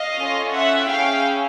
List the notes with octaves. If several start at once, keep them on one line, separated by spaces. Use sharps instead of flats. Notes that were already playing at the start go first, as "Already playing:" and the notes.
Already playing: D#5 F5
C#4 F4 A4
E5 F#5
C#4 E4 G#4 F5 G5